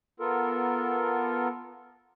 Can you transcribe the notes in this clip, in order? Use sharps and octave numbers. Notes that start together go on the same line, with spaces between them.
B3 F4 A4 A#4